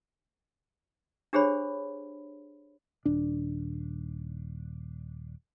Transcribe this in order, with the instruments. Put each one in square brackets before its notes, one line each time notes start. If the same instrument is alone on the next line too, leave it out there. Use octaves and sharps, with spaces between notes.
[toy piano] D4 G4 G#4 C5 C#5 B5
[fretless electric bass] D#1 D4